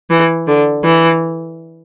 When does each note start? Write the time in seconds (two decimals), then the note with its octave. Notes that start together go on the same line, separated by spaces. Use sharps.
0.10 E3
0.48 D3
0.84 E3